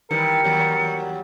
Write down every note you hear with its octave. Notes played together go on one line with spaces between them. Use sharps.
D#3 E3 G3 A#4 C#7
D#2 F#3 G3